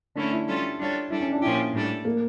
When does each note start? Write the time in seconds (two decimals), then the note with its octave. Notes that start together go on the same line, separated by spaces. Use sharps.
0.15 D3 A3 C#4 D4 E4 A4
0.32 E4
0.48 G3 C#4 F4 A4
0.79 G3 D4 F4 A4 C#5
1.10 G3 D4 E4 A4
1.21 C#4
1.32 D4
1.42 A#2 F3 C#4 E4 G4
1.74 A2 G3 D4 A4
2.05 A#3